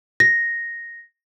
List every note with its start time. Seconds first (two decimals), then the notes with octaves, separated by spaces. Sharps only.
0.20 A#6